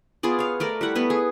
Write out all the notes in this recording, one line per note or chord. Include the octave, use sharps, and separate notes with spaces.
B3 F4 G#4 D5
C#5 F5
A3 A#4 D5
G3 E4 F#5
A3 B3 B4
G#4